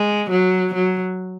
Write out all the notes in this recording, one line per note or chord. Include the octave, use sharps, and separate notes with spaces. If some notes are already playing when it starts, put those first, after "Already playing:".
Already playing: G#3
F#3
F#3